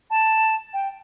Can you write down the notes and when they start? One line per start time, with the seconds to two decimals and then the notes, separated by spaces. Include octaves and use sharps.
0.10 A5
0.73 G5